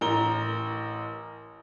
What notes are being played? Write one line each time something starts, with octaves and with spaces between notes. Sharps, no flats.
A1 A#4 A#5 G7